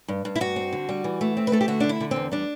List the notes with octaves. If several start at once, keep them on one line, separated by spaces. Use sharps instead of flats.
G2
G2
E4
G2 F#4
C4
D3
G3
E3
A3
C4
B4
A3 A4
G4
D3 F#4
D3 D4
E4
D3
C4
E2
G3 D4